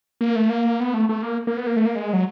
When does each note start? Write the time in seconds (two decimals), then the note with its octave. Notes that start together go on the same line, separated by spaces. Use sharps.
0.21 A#3
0.36 A3
0.50 A#3
0.80 B3
0.94 A3
1.09 A3
1.23 A#3
1.47 A#3
1.57 B3
1.67 A#3
1.77 A3
1.86 A#3
1.95 G#3
2.13 F#3